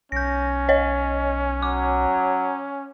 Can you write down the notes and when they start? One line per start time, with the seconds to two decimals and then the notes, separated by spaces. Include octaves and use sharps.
0.12 B1 C#4 G6 A#6
0.69 C#5 D#5
1.62 F#3 D6